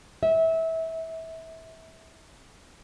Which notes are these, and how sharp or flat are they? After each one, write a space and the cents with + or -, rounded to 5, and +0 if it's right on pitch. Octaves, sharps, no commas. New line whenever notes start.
E5 -25